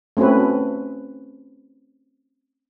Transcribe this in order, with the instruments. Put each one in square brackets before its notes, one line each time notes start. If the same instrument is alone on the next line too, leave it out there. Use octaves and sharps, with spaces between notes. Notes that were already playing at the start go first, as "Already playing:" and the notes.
[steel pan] A3 C4 C#4 F#4 B4